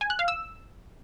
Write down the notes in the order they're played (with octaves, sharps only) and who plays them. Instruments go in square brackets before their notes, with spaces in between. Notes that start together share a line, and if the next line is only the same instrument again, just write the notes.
[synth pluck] G#5
F#6
F5
E6